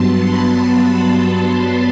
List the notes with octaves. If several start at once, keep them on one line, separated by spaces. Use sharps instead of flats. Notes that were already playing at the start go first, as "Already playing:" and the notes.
Already playing: G2 F#3 B3 A5 C6
B5
A5
B5
B5